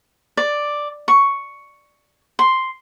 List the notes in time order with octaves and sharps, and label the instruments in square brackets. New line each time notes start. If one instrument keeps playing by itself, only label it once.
[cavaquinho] D5
C#6
C6